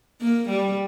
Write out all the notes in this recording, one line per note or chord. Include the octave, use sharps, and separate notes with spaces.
A#3
G3